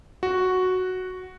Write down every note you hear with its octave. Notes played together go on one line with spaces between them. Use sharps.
F#4